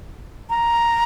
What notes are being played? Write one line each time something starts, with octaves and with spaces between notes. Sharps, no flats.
A#5